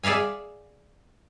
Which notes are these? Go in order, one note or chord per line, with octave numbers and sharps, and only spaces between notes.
G#4 D5 E5 F5 G#5